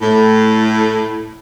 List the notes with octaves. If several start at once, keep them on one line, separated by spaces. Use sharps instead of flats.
A2